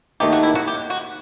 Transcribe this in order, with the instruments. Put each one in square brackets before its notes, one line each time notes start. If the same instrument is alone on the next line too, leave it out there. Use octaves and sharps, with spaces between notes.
[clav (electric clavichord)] D#2 D#3 A3 D#4 [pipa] G4
[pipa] F#4
E4
F#4
G4
F#4